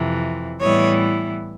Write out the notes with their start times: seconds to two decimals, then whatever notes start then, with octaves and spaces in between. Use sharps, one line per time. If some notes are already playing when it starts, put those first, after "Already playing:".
Already playing: F2 C3 E3
0.62 A2 E3 G3 B3 E4 C#5 D#5